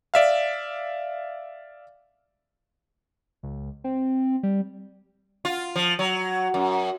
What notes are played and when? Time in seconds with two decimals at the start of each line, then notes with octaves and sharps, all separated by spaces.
0.14 D5 E5 F5
3.43 C#2
3.84 C4
4.43 G3
5.45 F4
5.76 F3
5.99 F#3
6.54 F#2